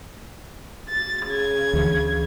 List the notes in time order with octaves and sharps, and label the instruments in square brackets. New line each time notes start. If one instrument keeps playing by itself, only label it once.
[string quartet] A6
C#3 G#6
[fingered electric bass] D2 E3